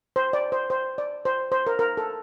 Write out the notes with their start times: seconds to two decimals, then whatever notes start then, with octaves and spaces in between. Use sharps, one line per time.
0.16 C5
0.33 D5
0.52 C5
0.70 C5
0.98 D5
1.25 C5
1.52 C5
1.67 A#4
1.79 A#4
1.97 A4